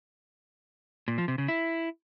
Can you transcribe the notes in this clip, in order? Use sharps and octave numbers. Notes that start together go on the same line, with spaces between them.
A#2
F3
C3
C#3
E4